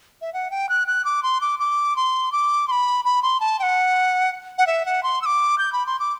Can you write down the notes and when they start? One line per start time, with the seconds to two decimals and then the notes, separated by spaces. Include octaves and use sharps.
0.22 E5
0.34 F#5
0.51 G5
0.69 F#6
0.87 F#6
1.05 D6
1.23 C6
1.41 D6
1.59 D6
1.96 C6
2.32 D6
2.68 C6
2.71 B5
3.05 B5
3.23 C6
3.40 A5
3.59 G5
3.63 F#5
4.58 F#5
4.67 E5
4.86 F#5
5.03 C6
5.22 E6
5.26 D6
5.58 G6
5.73 B5
5.87 C6
5.99 D6